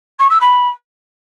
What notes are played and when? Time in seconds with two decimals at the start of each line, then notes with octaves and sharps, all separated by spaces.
0.19 C#6
0.30 E6
0.40 B5